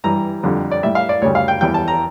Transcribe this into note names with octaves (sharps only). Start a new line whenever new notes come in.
G2 E3 G3 A#5
F2 D3 G3
D5
A2 G3 E5
F5
D5
D2 C#3 G3 C#5
F5
G5
E2 E3 G3 G5
A5
A#5